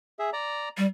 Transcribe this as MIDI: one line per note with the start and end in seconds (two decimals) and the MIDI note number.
0.19 0.30 68
0.19 0.30 76
0.33 0.69 74
0.33 0.69 82
0.77 0.86 55